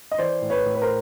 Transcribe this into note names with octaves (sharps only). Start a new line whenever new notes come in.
D#5
E3 C5 D5
A2
B4 C#5
A2
B4
A#4 C5